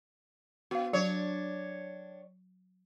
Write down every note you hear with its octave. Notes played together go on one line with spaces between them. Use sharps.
B3 F#4 F5
F#3 D4 C#5